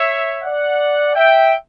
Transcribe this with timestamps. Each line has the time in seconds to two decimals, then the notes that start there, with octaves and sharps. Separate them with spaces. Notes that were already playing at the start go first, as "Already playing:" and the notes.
Already playing: C#5 E5
0.42 D5 F#5
1.15 E5 G5